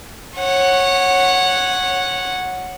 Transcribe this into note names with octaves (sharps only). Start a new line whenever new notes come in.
C#5 F#5